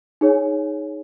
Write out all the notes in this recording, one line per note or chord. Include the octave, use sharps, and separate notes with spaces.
D#4 G#4 C#5 G#5